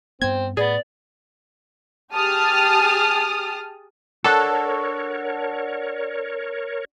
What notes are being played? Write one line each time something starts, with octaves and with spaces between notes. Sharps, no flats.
G2 B3 C4 G#6
A2 B3 G#4 D5
G4 G#4 A5 D#6 F6
D4 F#4 A4 A#4 C#5